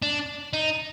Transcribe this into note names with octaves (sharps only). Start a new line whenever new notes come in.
D4
D#4